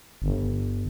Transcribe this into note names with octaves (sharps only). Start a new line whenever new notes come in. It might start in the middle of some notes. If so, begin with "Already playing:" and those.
G1